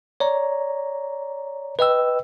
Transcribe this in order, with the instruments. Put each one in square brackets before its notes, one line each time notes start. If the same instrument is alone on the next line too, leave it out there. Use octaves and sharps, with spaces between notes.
[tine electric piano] C#5 D5 A#5
B4 D#5 G5 E6